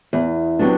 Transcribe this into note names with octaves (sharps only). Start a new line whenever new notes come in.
E2
C3 F#3 B3 D4